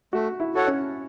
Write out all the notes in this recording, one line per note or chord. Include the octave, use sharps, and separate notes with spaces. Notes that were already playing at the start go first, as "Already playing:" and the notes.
A3 F#4
E4
F#4 A4 C#5 F#5
C#4